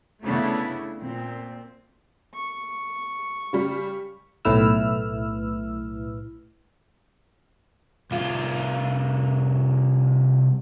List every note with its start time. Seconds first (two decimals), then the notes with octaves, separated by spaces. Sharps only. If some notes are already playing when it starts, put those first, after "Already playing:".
0.24 C#3 A3 B3 C#4 D4 E4
1.00 A#2 C4
2.34 C#6
3.53 C#3 G3
4.45 B1 A2 E4 B4 E6 F6
8.11 C2 F4